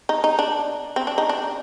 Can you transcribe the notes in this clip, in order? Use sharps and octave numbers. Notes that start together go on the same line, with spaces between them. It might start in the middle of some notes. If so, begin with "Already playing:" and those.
D#4
D#4
D4
C4
D4
D#4
D4